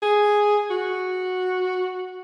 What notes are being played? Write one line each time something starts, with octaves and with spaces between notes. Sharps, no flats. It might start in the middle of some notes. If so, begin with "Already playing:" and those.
G#4
F#4